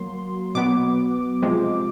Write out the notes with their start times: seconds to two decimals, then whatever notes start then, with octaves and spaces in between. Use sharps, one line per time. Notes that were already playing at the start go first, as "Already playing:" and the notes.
Already playing: F#3 A#3 C6
0.55 B2 F#3 B3 D6
1.42 C3 F3 G#3